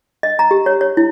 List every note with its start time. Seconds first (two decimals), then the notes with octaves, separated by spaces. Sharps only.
0.23 D#5
0.39 A#5
0.51 G4
0.66 C#5
0.81 C#5
0.97 E4